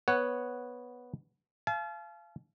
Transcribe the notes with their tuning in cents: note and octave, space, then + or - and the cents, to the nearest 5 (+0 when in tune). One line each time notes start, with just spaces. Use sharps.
B3 -5 C#5 +0 F#5 +0
F5 -30 A5 -45